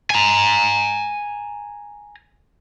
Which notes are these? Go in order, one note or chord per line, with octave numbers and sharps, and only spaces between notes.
G#5 A#5